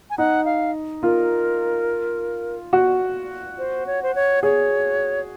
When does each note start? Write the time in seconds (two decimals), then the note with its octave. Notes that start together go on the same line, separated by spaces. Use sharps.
0.10 G#5
0.18 D#4 F#5
0.45 F5
1.03 F4 A#4
2.73 F#4
3.58 C5
3.87 C#5
4.03 C5
4.15 C#5
4.43 G#4 C#5